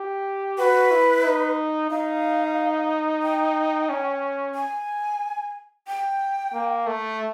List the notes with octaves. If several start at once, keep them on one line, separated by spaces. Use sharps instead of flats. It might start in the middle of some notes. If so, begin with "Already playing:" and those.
Already playing: G4
F#4 B4
E4
D#4
D#4 F5
G5
C#4
G#5
G5
A#3
A3